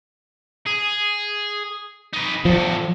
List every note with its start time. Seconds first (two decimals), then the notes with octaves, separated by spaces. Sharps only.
0.66 G#4
2.13 D#4 B4
2.45 E2 A2 F3